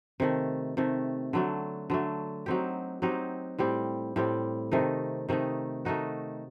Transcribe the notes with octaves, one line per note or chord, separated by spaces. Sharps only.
C3 D#3 A3
C3 D#3 A3
D3 F#3 A3
D3 F#3 A3
F#3 C4 D#4 G4
F#3 C4 D#4 G4
A2 G3 C4 G4
A2 G3 C4 G4
C3 D#3 A3 D#4
C3 D#3 A3 D#4
D#3 A3 D#4 F#4